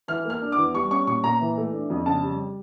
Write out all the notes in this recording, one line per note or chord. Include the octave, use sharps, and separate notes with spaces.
E3 F6
A#3
F6
D4
D6
E2
G3 C#6
C#4 C#6
A#2 C#6
A#2 A#5
E3
A3
D4
F2
C#3 A5
G3